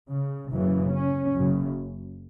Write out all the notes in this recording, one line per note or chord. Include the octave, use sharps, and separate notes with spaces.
C#3
F#1 F#2 C#3 E3
C#4
F#1 F#2 C#3